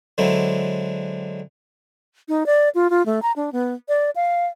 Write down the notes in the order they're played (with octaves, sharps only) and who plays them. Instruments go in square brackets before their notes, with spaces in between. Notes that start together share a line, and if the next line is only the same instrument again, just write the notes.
[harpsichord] D3 F#3 G#3 C4 E4
[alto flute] D#4
D5
F4
F4
A3
A#5
D4
B3
D5
F5